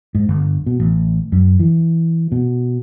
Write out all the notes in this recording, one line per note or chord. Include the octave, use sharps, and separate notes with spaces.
G#2
G1
B2
A1
F#2
E3
B2